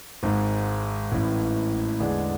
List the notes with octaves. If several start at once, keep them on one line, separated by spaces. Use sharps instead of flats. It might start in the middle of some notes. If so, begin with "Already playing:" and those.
G#1 G#2 G#3
A1 A2 E3
E2 D3 G#3 D4 G#4